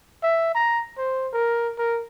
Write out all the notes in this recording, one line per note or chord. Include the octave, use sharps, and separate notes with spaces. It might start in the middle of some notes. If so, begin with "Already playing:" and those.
E5
A#5
C5
A#4
A#4